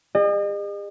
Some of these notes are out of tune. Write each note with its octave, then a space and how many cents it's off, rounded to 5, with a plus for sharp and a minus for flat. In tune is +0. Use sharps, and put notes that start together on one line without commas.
G#4 -45 D#5 -40